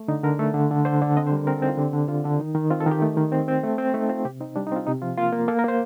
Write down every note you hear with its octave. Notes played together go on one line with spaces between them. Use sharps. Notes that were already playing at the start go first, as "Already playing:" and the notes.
Already playing: A3
D3 D#4
D3 A#4
A3 A4
D3
D3
D3 C5
D3
C4 D#5
C5
G3 A#4
C4 A#4
A4
C4 D#4
F4
D3 G4
D3
D3 F4
D3 D4
D#3 D#4
D#3
C4 F4
A4
D#3
G4
A3
D#3
C4
C4
A3
C4
A3 D#4
C4 F4
C3 G4
C4 D#4
G3 D4
D#4
C4 F4
C3 D#4
F3 F4
A#3 F4
A#3
A#3 A4
A#4
A#3 C5